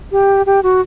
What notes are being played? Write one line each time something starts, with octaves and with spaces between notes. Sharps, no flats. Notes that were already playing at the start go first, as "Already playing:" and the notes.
G4
G4
F#4